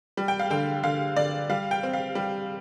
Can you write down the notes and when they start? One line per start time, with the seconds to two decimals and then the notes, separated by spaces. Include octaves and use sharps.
0.17 G3
0.28 G5
0.39 F5
0.50 D3 G5
0.83 D3 F5
1.17 D3 D5
1.49 G3 F5
1.71 G5
1.83 C4
1.93 F5
2.15 G3